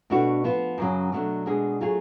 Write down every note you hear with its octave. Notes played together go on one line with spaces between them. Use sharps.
B2 A3 D4 F#4
F3 B3 F4
F#2 C#3 F#3 C#4
B2 F#3 A3 D4
B2 G#3 D4 G#4
F#3 A3 F4 G#4